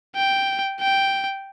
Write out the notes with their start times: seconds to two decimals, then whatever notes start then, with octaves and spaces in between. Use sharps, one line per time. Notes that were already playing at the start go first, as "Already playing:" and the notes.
0.16 G5
0.80 G5